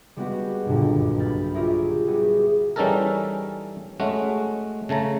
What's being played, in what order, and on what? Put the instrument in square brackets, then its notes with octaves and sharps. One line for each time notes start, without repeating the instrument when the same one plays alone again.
[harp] G3 G#3 B3 F#4 F#5 G5
F#1 B1 G2 A#2 D3
B5 F6 G6 A6
F4 G4 G#4 A#4 C#5 E5
G3 B3 F#4 G#4
[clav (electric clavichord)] E3 G3 C#4 D#4 A4 A#4
G#3 A3 C#4 F#4
C#3 A3 A5 A#5